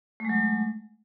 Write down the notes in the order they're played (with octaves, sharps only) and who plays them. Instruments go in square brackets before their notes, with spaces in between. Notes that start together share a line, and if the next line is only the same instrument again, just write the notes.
[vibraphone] A3
G#3
F#3